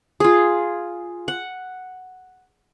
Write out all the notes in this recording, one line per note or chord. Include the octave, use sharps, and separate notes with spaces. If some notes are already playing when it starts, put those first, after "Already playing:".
F4 G#4
F#5